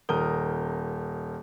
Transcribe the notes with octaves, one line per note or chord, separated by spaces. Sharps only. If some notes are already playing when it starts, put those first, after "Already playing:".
D#1 A#4 D#6 G7